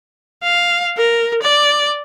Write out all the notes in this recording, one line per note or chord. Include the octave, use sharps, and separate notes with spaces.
F5
A#4
D5